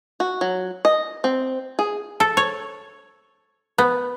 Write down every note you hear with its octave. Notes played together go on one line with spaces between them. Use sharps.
F#4
F#3
D#5
C4
G#4
A4
C#5
B3